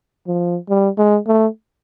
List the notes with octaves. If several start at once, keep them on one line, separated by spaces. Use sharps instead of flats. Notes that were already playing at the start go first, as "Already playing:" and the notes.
F3
G3
G#3
A3